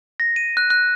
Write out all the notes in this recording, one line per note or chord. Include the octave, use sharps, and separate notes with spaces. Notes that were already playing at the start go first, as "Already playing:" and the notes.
A#6
D#7
F#6
F#6